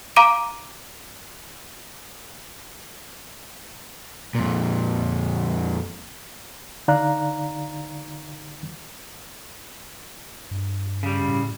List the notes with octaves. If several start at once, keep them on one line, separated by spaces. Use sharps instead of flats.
F5 A#5 D6 D7 D#7
F2 A#2
D3 D#4 D5 F5 A#5 F#6
G2
C#3 G3
A2